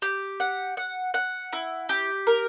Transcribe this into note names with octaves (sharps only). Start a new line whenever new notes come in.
G4
F#5
F#5
F#5
E4
G4
A#4